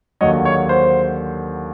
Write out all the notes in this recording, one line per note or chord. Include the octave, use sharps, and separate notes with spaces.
D#2 D3 F#3 C#5 D#5
C#5
C5